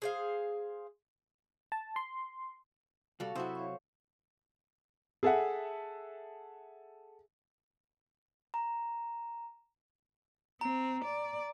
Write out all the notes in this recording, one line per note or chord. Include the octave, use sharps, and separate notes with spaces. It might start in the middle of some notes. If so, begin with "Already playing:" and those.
G#4 C5 F5
A5
C6
C2 G3 F#4 A4 F5 A5
C3 F#3 E4 F#4 C5 D#6 E6
C#5 F5 C#6
G#4 A4 E5 F#5
A#5
C4 A#5
D5